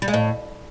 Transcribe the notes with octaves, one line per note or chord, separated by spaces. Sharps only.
G3
G#3
A2